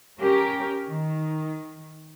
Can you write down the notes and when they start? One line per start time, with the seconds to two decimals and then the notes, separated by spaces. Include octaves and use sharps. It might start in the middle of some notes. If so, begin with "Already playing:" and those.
0.20 C#4 G4 A#4
0.87 D#3